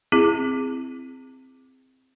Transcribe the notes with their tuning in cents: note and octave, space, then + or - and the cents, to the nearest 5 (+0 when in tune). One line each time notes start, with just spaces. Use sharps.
C4 +0 E4 +15 G#4 -10